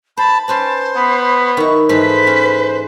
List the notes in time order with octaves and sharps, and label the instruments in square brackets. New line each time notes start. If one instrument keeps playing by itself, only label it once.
[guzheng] C5 [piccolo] A5 [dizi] B5
[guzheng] C#4 B4 D5 [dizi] C5 [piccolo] A5
[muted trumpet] B3 [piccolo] B5
[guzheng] D#3 E4 [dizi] C#6
[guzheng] G#2 E3 A3 [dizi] B4 [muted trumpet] C5 [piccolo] B6
[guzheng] C#4